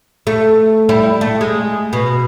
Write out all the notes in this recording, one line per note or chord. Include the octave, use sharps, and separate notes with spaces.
A3
G3 E4
A3
G#3
B2